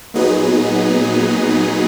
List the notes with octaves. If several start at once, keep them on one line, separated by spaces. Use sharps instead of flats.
A#2 F#3 B3 D#4 G#4